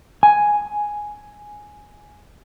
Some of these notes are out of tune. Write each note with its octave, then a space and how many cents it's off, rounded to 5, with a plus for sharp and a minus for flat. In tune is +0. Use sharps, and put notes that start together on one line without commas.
G#5 +5